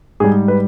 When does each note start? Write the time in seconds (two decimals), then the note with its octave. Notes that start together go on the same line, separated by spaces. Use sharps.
0.20 G#2 G3 G#4
0.48 B4